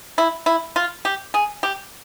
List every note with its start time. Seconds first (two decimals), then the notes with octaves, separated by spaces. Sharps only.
0.18 E4
0.46 E4
0.76 F4
1.05 G4
1.34 G#4
1.63 G4